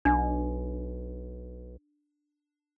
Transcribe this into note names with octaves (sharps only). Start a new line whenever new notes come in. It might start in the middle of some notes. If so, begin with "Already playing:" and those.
B1 D4